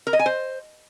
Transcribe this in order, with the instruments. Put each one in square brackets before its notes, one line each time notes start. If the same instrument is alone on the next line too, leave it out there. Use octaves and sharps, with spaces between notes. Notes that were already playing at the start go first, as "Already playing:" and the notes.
[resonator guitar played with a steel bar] A#4
D#5
G#5
C5